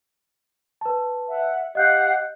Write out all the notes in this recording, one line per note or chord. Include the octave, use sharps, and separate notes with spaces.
B4 A5
E5 F#5
G4 D#5 F5 F#5 F#6 G6